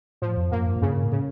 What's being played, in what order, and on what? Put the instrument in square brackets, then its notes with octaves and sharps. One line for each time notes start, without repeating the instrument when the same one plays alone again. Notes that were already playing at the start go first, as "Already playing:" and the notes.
[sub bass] A2 [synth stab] F3
[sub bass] F2
[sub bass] F#2 [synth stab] A#3
[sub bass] G2
G#2
[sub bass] G2 [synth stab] C#3
[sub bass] A2
[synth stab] C#3